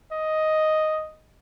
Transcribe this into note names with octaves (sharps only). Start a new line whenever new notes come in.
D#5